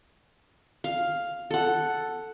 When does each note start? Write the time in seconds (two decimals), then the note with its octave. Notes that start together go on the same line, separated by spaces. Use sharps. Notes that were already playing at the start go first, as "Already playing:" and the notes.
0.84 F5
1.51 A4 F#5